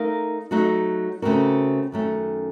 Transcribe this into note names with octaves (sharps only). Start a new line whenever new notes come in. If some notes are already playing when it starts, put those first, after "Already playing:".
Already playing: A3 D#4 A#4 F5
F#3 A3 D#4 F#4
C#3 A3 C4 F#4 A#4
F#2 D#3 A3 C#4